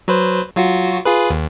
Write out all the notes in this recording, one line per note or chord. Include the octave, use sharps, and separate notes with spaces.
F#3 B4 C5
F#3 F4 F#4
F4 G#4 B4
D#2